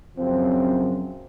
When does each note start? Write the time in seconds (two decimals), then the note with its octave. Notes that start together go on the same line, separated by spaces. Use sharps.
0.17 F#2 C#3 F3 C4